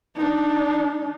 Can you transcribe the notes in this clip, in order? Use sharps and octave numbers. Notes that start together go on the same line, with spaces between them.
D4 D#4